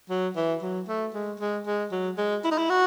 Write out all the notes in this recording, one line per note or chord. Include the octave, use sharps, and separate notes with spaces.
F#3
E3
F#3
A3
G#3
G#3
G#3
F#3
G#3
E4
D#4
E4
F#4